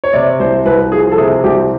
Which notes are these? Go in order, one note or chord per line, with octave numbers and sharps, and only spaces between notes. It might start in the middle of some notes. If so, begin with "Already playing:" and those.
C#5
C3 D5
C2 C5
C2 B4
F3 G#4
A4
C3 G#4
C2 G4